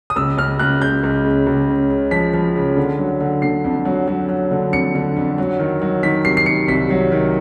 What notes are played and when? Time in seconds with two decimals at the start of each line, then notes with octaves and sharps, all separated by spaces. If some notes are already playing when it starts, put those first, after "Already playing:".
0.10 D#6
0.16 C#2 E6
0.38 C#2 F6
0.59 C#2 F#6
0.82 C#2 G6
1.04 C#2
1.25 C#3
1.46 C#2
1.69 C#3
1.90 C#3
2.11 F3 B6
2.34 F3
2.56 C#3
2.77 D3
2.99 F#3
3.21 D3
3.42 D3 C7
3.64 F2
3.85 F#3
4.08 F#3
4.29 F#3
4.51 D3
4.73 F2 C#7
4.95 D3
5.16 F2
5.38 F#3
5.59 D#3
5.82 F#3
6.03 D#3 B6
6.25 C3 C7
6.37 C7
6.46 D#3 C#7
6.68 C2 B6
6.90 F#3
7.12 D#3